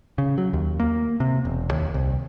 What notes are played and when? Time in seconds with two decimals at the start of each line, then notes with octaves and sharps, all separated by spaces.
0.18 C#3
0.38 F#3
0.53 D#2
0.80 A#3
1.20 C3
1.45 E1
1.71 D#2
1.94 C2